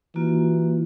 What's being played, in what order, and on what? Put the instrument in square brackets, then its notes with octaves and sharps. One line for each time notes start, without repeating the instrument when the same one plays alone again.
[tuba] E3 [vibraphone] A#3 F4 F#4